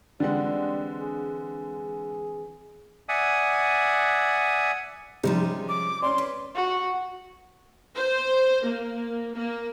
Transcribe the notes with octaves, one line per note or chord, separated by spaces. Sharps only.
D3 E3 G3 G#3 C4 F#5
G#4
D5 E5 F#5 G#5 D#6
C3 F3 G3 G#3 C#4 D#4
D6
C#4 D5 C6
B4
F#4
C5
A#3
A#3